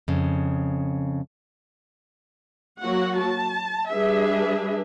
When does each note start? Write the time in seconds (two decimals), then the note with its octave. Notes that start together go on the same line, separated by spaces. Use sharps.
0.08 F2 C#3
2.80 F#3 A#3 F#4 F#5
3.20 A5
3.90 G3 D4 G#4 B4 E5